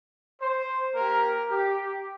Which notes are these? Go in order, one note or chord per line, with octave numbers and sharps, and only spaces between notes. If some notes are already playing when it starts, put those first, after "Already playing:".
C5
A#3 G4 A#4
G4